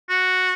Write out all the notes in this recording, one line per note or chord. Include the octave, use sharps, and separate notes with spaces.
F#4